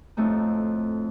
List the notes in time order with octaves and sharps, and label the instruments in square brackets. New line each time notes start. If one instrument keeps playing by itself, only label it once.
[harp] F2 A2 A3 C4 D#4